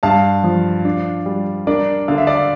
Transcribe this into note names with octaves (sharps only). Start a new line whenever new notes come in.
G2 F5 A5
F3
D4
G3
D4 A#4 D5
D3 F5
E5
D5 F5